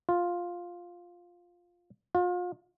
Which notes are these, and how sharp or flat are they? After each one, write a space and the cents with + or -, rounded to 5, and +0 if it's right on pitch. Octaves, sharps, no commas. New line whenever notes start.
F4 +5
F4 +35